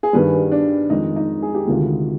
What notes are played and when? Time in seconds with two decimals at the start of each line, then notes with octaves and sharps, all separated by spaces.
0.03 G#4
0.13 G2 D#3 G3 B4
0.52 D4
0.90 F2 D#3 G#3 D#4
1.16 D#4
1.42 G#4
1.55 G4
1.66 D2 C3 D#3 G#3 F4